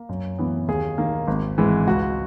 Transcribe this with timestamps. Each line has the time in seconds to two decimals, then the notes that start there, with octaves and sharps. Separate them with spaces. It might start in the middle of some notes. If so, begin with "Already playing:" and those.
Already playing: A#3
0.09 F#2
0.38 E3 B3
0.68 D#2 G#4
0.98 D#3 A#3
1.27 G#1
1.58 G#2 E3 G#3
1.87 C#2 F#4